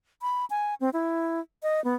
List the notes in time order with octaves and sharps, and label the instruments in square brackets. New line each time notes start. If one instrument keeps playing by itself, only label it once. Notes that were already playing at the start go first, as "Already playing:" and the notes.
[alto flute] B5
G#5
C4
E4
D#5
B3